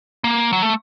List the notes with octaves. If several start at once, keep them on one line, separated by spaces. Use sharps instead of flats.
A#3
F#3
A3